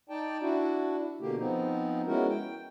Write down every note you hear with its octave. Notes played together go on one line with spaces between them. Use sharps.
D#4 D5 G5 A5
D4 E4 F#4
B2 D3 A#3 G4
F3 B3 C4 D#4
G#3 B3 C#4 E4 F#4 A#4
G5